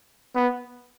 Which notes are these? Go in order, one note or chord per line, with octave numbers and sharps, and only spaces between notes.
B3